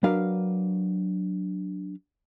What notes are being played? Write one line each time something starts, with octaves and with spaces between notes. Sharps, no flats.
F#3 D4 A#4 B4 F5